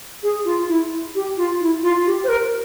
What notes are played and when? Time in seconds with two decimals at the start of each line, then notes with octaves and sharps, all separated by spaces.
0.23 G#4
0.45 F4
0.68 E4
1.15 G4
1.37 F4
1.61 E4
1.83 F4
2.06 G4
2.24 C5
2.29 A#4